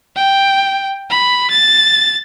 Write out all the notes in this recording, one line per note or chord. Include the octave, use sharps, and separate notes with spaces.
G5
B5
A6